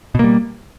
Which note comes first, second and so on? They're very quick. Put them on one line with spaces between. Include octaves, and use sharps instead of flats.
B2 A#3 G3